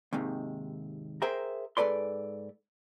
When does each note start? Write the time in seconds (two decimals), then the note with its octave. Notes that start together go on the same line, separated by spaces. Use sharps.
0.13 D#2 G#2 C3 D#3
1.22 G#4 A#4 C5 E5 G5 A#5
1.77 G#2 A4 B4 D5 C6